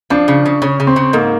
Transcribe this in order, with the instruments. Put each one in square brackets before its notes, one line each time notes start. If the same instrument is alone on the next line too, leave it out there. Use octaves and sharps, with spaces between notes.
[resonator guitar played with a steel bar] F3 [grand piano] D4
[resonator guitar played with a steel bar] C#3
C#3
[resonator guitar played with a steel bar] C#3 [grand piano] C#4
[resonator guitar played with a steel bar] C#3
[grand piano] C4
[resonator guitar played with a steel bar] C#3
[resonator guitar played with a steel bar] G#2 [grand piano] A#3